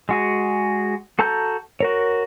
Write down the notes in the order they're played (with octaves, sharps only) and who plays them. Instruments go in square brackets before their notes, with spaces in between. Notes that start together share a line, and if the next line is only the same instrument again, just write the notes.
[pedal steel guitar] G#3 F#4 G#4
F#4 A4 A5 A#5 G6
F#4 A#4 C#5